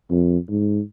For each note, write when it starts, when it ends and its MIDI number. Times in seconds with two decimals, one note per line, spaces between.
0.10 0.37 41
0.49 0.80 44